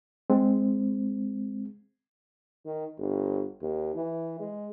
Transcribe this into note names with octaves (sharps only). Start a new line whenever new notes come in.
G#3 C4
D#3
G1
D#2
E3
G#3